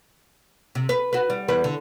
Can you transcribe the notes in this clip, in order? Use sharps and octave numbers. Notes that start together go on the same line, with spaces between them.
C3
B4
F#4 B4
G3
E2 G3 B4
D3